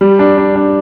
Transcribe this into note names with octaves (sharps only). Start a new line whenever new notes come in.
G3
D4
D4
D4